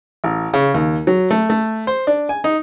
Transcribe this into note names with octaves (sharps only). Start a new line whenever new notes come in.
A1
C#3
D#2
F#3
A3
A3
C5
D4
G#5
D#4